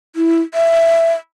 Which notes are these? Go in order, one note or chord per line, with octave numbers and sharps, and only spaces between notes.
E4
E5